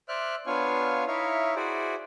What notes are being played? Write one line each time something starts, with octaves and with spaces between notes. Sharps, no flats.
C5 D5 E5 F6 F#6
B3 D4 F4 C#5 F5 G#5
D#4 E4 C#5 E5 F5
E4 F#4 G#4 C5 D5